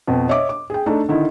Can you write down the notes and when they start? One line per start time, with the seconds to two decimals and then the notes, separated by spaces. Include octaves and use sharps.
0.08 F2 B2
0.29 C#5 D#5 E5 D6
0.49 D6
0.70 G#4 G5
0.86 A3 D4 D#4
1.09 D3 D#3 E4